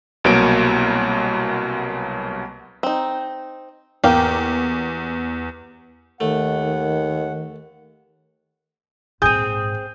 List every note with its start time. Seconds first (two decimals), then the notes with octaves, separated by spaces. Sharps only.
0.24 C2 B2 F#3 A#3 D7
2.83 C4 D#4
4.04 E2 A#3 G4 F5
6.20 D#2 D#3 A3 F#5
9.22 A#1 G#2 C4 G#4 D#6 G6 D#7